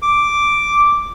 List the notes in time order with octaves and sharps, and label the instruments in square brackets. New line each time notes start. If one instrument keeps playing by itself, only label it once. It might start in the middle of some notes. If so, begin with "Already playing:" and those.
[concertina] D6